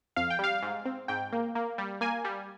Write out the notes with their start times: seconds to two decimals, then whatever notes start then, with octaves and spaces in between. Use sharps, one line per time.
0.16 F2 F5
0.30 G5
0.39 G3 F5
0.62 G#2
0.85 C4
1.08 G#2 G5
1.33 A#3
1.55 A#3
1.78 G3
2.01 A#3 G#5
2.25 G3